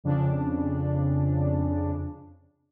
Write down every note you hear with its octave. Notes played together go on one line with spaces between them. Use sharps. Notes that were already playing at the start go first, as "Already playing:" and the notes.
F2 C#3 D4